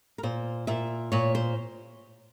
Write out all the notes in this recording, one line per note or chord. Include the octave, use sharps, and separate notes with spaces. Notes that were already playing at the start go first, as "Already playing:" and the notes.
A#4
A#2 C5
A#2 E5
A#2 C#5
C5